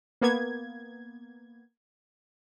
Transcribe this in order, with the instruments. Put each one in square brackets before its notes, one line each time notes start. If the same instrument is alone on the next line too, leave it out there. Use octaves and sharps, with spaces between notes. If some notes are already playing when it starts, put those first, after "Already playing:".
[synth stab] A#3 B3 G#6